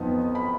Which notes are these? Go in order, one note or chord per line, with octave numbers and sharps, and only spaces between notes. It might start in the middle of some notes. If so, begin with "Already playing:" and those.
Already playing: F2 F3 B3 D#4
B5